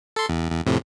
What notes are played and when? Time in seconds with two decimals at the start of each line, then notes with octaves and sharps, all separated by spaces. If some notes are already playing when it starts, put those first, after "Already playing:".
0.16 A4 C6
0.29 E2
0.51 E2
0.66 F2 A2 C3